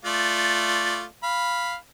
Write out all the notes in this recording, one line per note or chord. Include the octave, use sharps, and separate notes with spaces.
A3 F4 D5
F5 B5